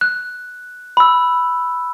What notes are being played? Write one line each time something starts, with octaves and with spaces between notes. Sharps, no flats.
F#6
B5 E6